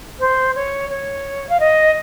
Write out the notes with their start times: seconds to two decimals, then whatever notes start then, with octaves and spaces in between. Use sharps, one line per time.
0.20 C5
0.55 C#5
0.90 C#5
1.49 F5
1.60 D#5